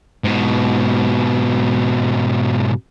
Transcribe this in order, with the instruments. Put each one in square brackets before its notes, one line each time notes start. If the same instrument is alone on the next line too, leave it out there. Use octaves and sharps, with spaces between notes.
[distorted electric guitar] G#2 B2